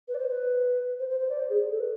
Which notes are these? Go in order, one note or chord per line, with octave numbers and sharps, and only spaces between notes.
B4
D5
C5
B4
C5
C5
C5
D5
C5
G#4
A4
B4